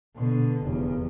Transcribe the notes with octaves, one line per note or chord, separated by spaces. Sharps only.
B2 D3
F1 E2